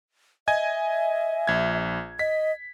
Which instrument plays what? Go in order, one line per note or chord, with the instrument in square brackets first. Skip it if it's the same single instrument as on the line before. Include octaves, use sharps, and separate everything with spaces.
[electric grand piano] D#5 G#5 G#6 [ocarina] E5
[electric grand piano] A#1 G#6
[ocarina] D#5 [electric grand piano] B6